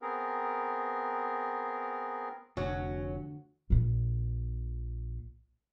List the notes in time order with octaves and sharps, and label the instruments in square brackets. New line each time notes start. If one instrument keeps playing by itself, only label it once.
[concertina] B3 C4 G#4 A#4
[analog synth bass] F1 [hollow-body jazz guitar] D2 [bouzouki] F#3 C#4 [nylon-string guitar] F#4
[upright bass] A#1 A#2